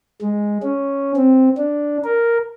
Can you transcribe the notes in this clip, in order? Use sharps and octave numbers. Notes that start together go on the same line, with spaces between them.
G#3
C#4
C4
D4
A#4